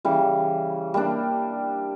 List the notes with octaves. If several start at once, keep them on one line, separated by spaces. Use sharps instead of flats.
C#3 E3 G3
G3 A#3 D4